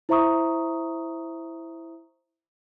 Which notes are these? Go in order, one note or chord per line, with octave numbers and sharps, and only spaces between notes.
E4 C5 E5 A#5 C#6 D#6